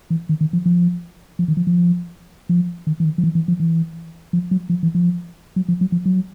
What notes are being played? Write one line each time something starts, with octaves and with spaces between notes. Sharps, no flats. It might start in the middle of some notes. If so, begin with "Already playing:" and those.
E3
D#3
D#3
F3
F3
F3
D#3
F3
F3
F3
D#3
E3
D#3
F3
E3
E3
F3
E3
F3
F#3
F3
E3
F3
F#3
F3
F#3
F3
F#3